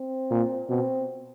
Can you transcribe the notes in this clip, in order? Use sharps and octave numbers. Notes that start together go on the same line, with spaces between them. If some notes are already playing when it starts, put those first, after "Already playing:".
Already playing: C4
A#2
B2 C4